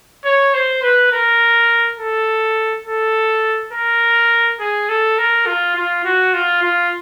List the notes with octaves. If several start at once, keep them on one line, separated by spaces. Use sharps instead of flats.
C#5
C5
B4
A#4
A4
A4
A#4
G#4
A4
A#4
F4
F4
F#4
F4
F4